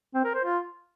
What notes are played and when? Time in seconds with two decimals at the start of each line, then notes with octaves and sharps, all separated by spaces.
0.14 C4
0.24 A#4
0.34 C5
0.44 F4